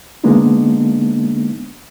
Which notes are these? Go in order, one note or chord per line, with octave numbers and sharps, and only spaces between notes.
D3 G#3 A#3 B3 D4 D#4